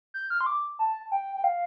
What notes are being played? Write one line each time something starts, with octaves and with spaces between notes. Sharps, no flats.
G6
F6
C6
D6
A5
G5
G5
F5